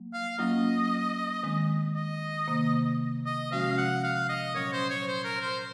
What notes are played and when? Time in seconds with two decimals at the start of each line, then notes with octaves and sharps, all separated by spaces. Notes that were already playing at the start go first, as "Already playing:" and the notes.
Already playing: F#3 A#3
0.13 F5
0.38 F#3 A#3 C#4 F4 D#5
1.43 D#3 G#3 C4
1.95 D#5
2.47 C3 D#3 A#3
3.26 D#5
3.51 C3 F3 G#3 C#4 F#4 F5
3.78 F#5
4.04 F5
4.29 D#5
4.55 A#2 F#3 C#4 C#5
4.73 C5
4.90 C#5
5.08 C5
5.25 A#4
5.42 C5